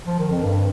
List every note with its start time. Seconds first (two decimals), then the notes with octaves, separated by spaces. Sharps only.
0.06 F3
0.19 D#3
0.30 F2
0.43 G2